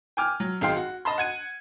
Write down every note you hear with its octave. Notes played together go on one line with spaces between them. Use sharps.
G5 G#5 D6 F6
F#3
G#1 D#4 G#4 F5 G5 C6
F#4
D#5 A5 B5 C6
F#5 G#6 D#7